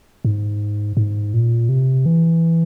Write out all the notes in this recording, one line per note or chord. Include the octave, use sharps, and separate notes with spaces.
G#2
G#2
A#2
C3
E3